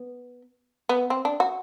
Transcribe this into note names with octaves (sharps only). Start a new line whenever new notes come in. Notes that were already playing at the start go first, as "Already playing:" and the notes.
Already playing: B3
B3
C4
D4
F#4